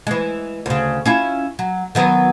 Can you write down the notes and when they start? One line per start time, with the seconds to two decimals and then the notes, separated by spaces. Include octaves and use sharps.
0.07 E3 G#3
0.66 D2 C#3
1.05 C#4 E4 F4
1.59 F#3
1.95 D#3 F#3 B3